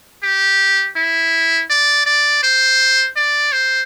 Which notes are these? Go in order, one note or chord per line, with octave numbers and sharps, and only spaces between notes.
G4
E4
D5
D5
C5
D5
C5